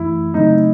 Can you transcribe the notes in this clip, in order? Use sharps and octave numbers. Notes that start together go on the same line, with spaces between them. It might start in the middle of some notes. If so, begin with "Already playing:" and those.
Already playing: F#2 E3 A3 E4
C#3 F#3 A3 C4 D#4